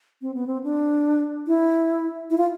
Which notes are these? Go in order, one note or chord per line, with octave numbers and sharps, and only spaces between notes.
C4
B3
C4
D4
E4
E4
F4